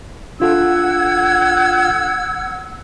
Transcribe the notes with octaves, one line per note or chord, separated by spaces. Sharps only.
D4 F4 A4 F#5 E6 G#6